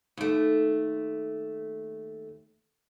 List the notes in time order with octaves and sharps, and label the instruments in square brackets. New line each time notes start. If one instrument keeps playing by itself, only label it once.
[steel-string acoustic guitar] D#2 A3